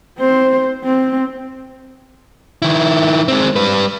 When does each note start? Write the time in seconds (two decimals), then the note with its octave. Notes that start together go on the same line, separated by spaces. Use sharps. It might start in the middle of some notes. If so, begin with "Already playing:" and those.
0.19 C4 C5
0.84 C4
2.62 D#3 E4
3.28 G#3 C4
3.56 G3 B4